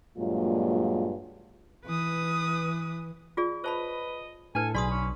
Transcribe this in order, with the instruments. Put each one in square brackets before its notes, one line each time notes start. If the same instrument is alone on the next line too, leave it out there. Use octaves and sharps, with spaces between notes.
[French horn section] G2 A#2 F#3 G#3 A#3 F4
[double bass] E3 [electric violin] B4 D#6
[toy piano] F4 G#4 D5
[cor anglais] B4 [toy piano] C5 A5 B5 [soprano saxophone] D#5
[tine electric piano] A2 [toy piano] D4 B4 [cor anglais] A4 [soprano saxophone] G#5
[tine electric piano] B1 [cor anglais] G#4 [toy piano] D5 C6 D#6 [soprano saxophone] B5
[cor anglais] C#4